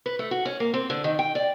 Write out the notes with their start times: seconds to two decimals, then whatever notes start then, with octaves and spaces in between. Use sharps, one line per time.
0.06 B4
0.19 A3
0.31 F#4
0.45 C#4
0.60 A#3
0.74 C4
0.90 D3
1.04 D#3
1.19 G5
1.35 D5